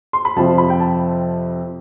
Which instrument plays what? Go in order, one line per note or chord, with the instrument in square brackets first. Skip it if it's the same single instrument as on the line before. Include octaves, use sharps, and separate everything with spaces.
[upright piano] C6
B5
F2 C3 F3 A5
B5
G5
A5